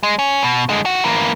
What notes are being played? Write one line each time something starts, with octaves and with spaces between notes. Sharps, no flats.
G#3
C#4
B2
D3 G#3
D#3 F#4
E3 A#3